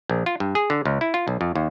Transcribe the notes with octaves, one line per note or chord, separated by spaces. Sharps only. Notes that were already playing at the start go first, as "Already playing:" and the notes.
A#1
F4
G2
G#4
D3
C#2
E4
F4
B1
F2
D#2